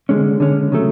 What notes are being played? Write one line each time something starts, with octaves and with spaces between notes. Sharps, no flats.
D3 G#3 C#4
D3 G#3 C#4
C#3 F#3 A3